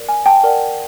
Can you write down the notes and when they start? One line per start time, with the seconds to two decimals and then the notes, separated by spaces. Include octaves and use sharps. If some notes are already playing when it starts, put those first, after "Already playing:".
Already playing: A#4 D5
0.09 G#5
0.26 G5 A5
0.44 A#4 D5 F#5